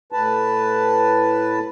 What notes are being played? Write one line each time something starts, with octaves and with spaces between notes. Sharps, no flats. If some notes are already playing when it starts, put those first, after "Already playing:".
A2 B4 A5